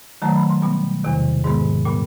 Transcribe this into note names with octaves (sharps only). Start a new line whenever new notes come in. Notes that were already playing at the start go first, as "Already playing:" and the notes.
D#3 F#3 A3 A#5
B5
C6
B2 G3 B3
E2 C3 D#3
G#2 D#3 G#3 B3
A#2 G3 B3